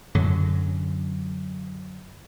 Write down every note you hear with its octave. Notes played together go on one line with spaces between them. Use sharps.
F#2 D3 F#3